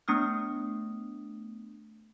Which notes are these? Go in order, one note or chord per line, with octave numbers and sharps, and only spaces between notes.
A3 B3 D4 D#6 F6